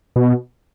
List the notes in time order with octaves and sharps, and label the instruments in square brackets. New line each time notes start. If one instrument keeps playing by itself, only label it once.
[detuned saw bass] B2